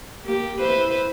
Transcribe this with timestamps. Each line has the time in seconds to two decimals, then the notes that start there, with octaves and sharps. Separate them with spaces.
0.24 A#3 G4
0.59 E4 B4 C5